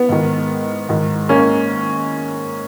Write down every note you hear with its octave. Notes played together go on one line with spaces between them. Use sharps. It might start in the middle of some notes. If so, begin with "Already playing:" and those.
Already playing: B3
G#2 D#3
G#2 D#3
A#3 C#4